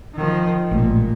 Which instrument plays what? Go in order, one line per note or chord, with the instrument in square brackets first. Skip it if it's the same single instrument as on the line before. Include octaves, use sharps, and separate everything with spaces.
[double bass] D#3 F3
[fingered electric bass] A1 G#3 A3 [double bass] A#2